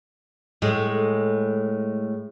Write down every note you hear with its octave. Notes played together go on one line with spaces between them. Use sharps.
A2 G#3